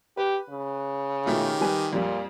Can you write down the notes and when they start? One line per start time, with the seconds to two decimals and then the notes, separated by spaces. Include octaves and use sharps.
0.17 G4 B4
0.50 C#3
1.26 B2 D#3 A3 F4 G4
1.61 G3 B4 G#5
1.93 F2 A#2 G3